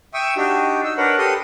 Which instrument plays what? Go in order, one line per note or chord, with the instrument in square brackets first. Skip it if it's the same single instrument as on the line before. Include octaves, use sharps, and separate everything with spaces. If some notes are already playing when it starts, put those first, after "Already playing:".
[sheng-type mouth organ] E5 G5 C#6 D#6 E6
D4 D#4 F#4 G4
D#4 E6
D4 A#4 B4 C#5 F#5
G4 A4 B4 C6 D#6